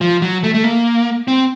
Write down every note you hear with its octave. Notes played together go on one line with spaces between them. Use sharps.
F3
F#3
A3
A3
A#3
C4